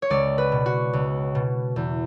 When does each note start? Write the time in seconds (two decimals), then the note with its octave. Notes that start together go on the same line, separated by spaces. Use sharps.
0.02 C#5
0.10 C#2 D5
0.38 B4
0.52 B2
0.66 F#4
0.93 C#2
1.35 B2
1.76 E2